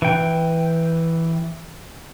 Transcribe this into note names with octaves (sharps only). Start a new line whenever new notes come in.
E3 G5